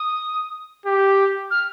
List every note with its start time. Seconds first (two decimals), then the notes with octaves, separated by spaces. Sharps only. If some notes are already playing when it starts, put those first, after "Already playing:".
Already playing: D#6
0.86 G4
1.51 F6